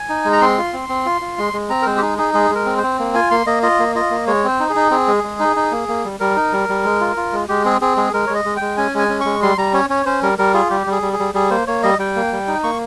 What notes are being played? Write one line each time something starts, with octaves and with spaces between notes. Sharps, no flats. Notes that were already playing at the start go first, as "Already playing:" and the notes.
Already playing: G#5
D#4
G#3
A#5
C4 C6
F4
C4
C4
F4
F4
G#3
G#3
C4 A#5
A#4
G#3 C5
G4
D#4 G#4
D#4 G#4
G#3 G#4
G#3 A#4
C4
C5
C4
A#3
F4 G#5
A#3 C6
A#3 D#5
F4 D#5
A#3
F4 D#5
A#3
G#3 C#5
C4 C5
D#4
G#4
D#4
C4 G#4
G#3
G#3
D#4
D#4
A#3
A#3
G3
G3 A#4
D#4
G3
G3
G#3
F4
F4
G#3
G#3 G4
C4 G#4
C4 G#4
G#3 G#4
G#3 A#4
G#3 C#5
D#5
G#3
G#3 G5
C#4 G#5
G#3 G#5
C#4
G#3 C#6
G3 C6
G3 A#5
C#4 C#5
C#4 C#5
C#4 C5
G3 A#4
G3 A#4
F4 G#4
G3 G4
G3 G#4
G3
G#4
G3
G3 G#4
A#3 C5
A#3 C#5
G3 D#5
G3 G5
A#3
G3
D#4
A#3 C#6